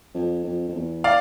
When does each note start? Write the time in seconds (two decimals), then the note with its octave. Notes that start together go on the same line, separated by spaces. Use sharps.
0.14 F2
0.44 F2
0.69 F2
0.75 E2
1.04 D5 F5